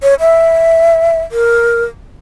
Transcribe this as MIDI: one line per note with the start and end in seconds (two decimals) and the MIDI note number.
0.03 0.14 73
0.20 1.21 76
1.32 1.84 70